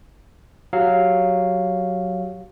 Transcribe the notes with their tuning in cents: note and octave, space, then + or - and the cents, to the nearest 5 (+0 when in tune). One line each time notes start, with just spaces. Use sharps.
F#3 +0 G4 +0 F5 +0